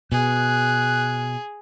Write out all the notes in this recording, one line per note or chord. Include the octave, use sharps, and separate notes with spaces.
B2 G#4 F#6